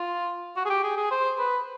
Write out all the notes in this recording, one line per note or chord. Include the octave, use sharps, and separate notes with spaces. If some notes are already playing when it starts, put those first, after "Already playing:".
Already playing: F4
F#4
G#4
G4
G#4
G#4
C5
B4